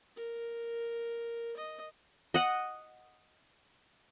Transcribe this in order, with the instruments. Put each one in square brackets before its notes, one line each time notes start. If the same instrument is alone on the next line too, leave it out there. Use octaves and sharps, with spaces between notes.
[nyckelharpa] A#4
D#5
[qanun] D#5 F#5